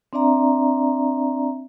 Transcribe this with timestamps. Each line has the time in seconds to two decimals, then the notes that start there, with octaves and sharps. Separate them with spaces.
0.13 C4 D4 D5 E5 A#5